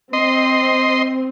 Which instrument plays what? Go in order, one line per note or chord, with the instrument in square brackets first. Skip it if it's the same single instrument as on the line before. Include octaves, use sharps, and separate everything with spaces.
[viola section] C4 [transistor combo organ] D#5 C6